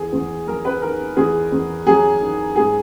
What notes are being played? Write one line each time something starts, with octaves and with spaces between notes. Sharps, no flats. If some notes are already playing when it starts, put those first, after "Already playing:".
Already playing: E2 G#4
E2
F#3 A#4
B4
D#3 A#4
E2 G#4
E2
F#3 G#4
D#3
G#2 G#4